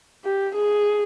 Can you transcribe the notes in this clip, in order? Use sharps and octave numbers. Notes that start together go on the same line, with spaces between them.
G4
G#4